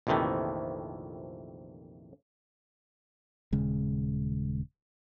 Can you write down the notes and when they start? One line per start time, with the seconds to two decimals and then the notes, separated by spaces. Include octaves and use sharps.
0.07 A#1 F2 C3 D#3 E3 A3
3.52 D#1 C#3 G#3